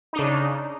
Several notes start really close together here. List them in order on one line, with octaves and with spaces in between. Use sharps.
D#4 D4 C#3